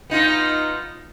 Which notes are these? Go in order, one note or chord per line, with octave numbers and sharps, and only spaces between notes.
B3 D#4 F4